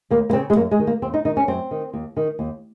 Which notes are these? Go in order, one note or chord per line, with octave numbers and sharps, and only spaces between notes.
D#2 A#3
A#3
C#3 C4
G#3
F#2 A#3
G#3
D#3
A#3
D#2 C4
D#4
D#3 D#4
C#4
F#2 C4
D#3
D#2
D#3
D#2